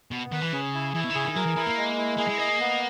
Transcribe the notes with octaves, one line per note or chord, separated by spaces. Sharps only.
B2 B3
D#3 B4
E3
C#3 G#4
E4
E3 E4
B2
D#3
C#3 G#4
D#3
F#3 A#4
E3
E3 E4
A#3
G#3
E4
A#3 G#4
G#3
A#3 D#5
B3